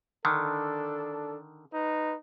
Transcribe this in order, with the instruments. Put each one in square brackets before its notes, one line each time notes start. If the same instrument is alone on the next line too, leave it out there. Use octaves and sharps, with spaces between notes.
[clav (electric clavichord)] D3 D#3 [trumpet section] D4 A4
[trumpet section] D#4 B4